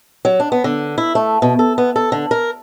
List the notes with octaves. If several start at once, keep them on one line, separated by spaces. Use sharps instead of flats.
F#3
D4
B3
D3
E4
A3
B2
A4
B3
A4
D3
A#4